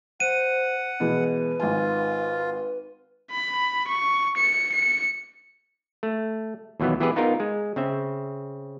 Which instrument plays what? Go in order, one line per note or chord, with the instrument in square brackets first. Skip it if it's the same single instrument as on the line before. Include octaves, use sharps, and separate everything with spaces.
[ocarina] C5 [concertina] F#5 [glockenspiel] D#7
[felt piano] B2 E3 G#3 [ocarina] B4
[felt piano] G#1 G#5 [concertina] F4
[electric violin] B5
C#6
C#7
C#7
[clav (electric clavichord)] A3
D#2 B2 E3 F#3 B3
E3 B3 G4 G#4 B4
B3 D#4 F4 A#4
G#3
C#3 C4 E5